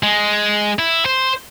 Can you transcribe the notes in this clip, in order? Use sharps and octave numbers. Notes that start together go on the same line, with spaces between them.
G#3
E4
C5